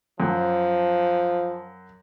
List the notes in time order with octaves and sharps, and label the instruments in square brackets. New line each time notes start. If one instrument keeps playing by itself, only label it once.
[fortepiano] F#2 [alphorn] F3